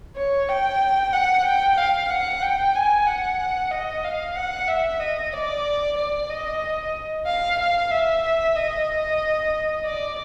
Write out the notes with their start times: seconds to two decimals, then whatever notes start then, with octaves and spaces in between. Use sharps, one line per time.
0.16 C#5
0.49 G5
1.13 F#5
1.46 G5
1.78 F5
2.10 F#5
2.42 G5
2.75 G#5
3.06 F#5
3.71 D#5
4.04 F5
4.36 F#5
4.68 E5
5.00 D#5
5.33 D5
5.97 D5
6.30 D#5
7.27 F5
7.60 F5
7.91 E5
8.56 D#5
9.85 D5